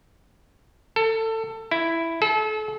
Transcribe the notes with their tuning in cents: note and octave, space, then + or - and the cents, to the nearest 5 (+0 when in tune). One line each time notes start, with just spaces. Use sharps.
A4 +25
E4 +5
A4 -35